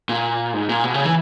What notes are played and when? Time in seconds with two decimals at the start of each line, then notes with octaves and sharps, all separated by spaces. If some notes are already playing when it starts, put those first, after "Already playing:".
0.09 A#2
0.54 G#2
0.69 A#2
0.84 B2
0.94 C#3
1.04 E3